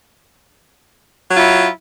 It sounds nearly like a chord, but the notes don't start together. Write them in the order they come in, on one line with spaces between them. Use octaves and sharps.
F#3 F4 E4